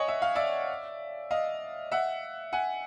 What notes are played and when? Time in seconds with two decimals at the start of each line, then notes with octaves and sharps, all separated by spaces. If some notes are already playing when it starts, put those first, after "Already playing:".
Already playing: C#5 D#5 F#5 G#5
0.08 E5
0.22 F5
0.35 D5 E5
1.31 D#5 F5
1.92 E5 F#5
2.53 F#5 G#5